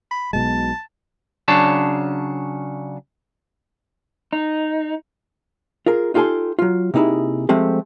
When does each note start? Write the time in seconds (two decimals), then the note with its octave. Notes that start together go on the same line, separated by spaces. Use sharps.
0.11 B5
0.33 B1 B2 G#3 A5
1.48 C#3 F#3 D4 C#5 A5
4.33 D#4
5.86 F4 G#4 A#4
6.14 D#4 F4 G4 A4 G#5 C6
6.59 F#3 F4
6.94 C3 A#3 D#4 E4 G#4
7.49 F3 G#3 A3 C4 G4